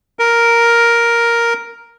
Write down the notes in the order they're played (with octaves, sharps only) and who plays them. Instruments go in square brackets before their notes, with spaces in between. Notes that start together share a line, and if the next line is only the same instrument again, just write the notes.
[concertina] A#4